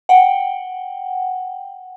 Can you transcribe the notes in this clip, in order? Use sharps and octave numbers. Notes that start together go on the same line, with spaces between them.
F#5 G5